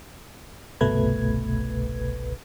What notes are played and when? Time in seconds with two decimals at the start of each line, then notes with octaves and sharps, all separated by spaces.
0.81 G1 C2 B2 A3 B4 G#6